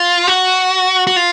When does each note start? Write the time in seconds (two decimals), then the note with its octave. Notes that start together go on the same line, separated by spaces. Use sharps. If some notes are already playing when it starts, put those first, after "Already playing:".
Already playing: F4
0.27 F#4
1.07 F#4
1.16 F4